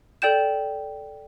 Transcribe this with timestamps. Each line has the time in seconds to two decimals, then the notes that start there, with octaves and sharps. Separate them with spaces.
0.22 A4 D5 G5 G6 E7